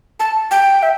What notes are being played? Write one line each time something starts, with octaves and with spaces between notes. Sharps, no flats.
A5
G5
E5